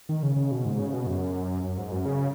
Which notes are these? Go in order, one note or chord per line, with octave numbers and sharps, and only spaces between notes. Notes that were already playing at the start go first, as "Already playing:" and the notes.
D#3
C#3
C#3
B2
G#2
C#3
B2
F#2
F#2
G#2
F#2
C#3